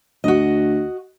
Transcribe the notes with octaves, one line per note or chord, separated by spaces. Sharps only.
D2 F#4 D#5